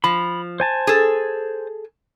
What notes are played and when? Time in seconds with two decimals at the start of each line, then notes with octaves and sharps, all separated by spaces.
0.04 F3 B5
0.60 C5 G#5 A5
0.87 G#4 A4